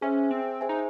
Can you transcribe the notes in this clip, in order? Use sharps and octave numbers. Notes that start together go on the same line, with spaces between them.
C#4 G#4 C5 E5 G#5
C4
G#4 C5 E5 G#5
D#4